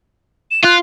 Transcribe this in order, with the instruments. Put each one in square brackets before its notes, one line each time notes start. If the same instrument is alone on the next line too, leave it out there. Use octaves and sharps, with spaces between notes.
[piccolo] E7
[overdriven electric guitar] F4 [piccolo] F#6